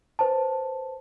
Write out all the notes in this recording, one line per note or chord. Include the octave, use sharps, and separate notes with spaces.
B4 C5 A5